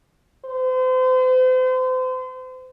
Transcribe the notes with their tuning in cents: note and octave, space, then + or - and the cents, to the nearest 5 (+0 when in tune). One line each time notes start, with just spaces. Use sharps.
C5 -35